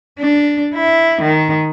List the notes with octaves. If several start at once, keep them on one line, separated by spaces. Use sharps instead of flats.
D4
E4
D#3